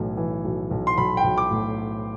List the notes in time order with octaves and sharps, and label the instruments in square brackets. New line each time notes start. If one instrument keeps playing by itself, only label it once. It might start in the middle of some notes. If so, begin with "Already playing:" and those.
Already playing: [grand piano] B1 A2 E3
E3
B1
B1
C6
B1 B5
G5
B1
D6
A2